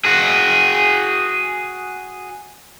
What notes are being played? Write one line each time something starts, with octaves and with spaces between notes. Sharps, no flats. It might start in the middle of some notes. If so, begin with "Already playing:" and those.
F#4 G#4